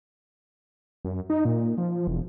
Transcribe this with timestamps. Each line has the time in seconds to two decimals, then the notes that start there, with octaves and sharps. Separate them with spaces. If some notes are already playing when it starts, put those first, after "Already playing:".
1.05 F#2
1.30 D#4
1.45 A#2
1.78 F3
2.07 E1